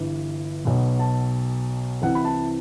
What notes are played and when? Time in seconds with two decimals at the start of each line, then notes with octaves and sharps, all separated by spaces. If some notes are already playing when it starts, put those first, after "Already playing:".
Already playing: G1 G2 E3
0.65 B1 B2
0.99 A5
2.02 C2 C3 E3 F#5
2.15 B5
2.25 A5